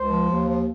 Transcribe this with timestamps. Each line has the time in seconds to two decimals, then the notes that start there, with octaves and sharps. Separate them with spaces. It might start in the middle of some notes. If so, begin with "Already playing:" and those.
Already playing: C#2 C5
0.10 F3
0.28 D#2
0.46 F3